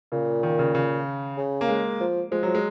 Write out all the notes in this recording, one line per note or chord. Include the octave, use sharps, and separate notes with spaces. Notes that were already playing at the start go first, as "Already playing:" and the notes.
A#2 C#3
D#3
C#3
C#3
C#3
A#3
G#3
F3
F3 G#3
F3 F#3
G#3